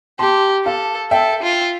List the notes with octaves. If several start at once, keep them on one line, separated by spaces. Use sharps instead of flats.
G4 A5 C6
A4 F5 A5
A4 E5 G5
F4